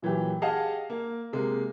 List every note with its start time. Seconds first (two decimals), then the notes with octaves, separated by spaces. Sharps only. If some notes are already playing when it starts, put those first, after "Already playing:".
0.02 A#2 E3 F#3 G4
0.42 G4 G#4 D#5 F5 F#5 A5
0.90 A#3
1.33 C3 G#3 A#3